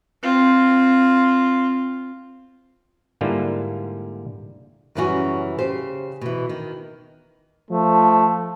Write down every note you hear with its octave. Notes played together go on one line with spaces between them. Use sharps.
C4 F4
G#2 D3 G3 A#3 E4 F4
F#2 C#3 E3 G3 C#4 F#4
C#3 G4 C5
B2 E3
D#3
F3 A3